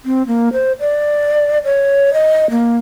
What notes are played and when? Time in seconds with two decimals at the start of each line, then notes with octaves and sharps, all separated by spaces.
0.05 C4
0.27 A#3
0.53 C5
0.80 D5
1.65 C#5
2.14 D#5
2.51 A#3